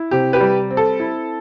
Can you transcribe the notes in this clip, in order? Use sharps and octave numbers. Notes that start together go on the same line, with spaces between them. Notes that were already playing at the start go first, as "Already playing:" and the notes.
Already playing: E4
C3 G4
G4 B4
G3
C4
A4
E4